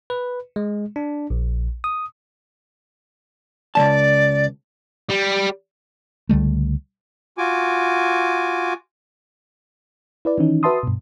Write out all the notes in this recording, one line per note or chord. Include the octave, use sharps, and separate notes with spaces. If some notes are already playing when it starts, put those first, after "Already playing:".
B4
G#3
D4
A#1
D#6
C#2 F3 D5 A5
G3
C#2 D3 G3 A3
F4 F#4 G#5 D6
E4 B4 D5
D#3 E3 C#4 D#4
F#4 B4 E5 A5 C6 D#6
G2 B2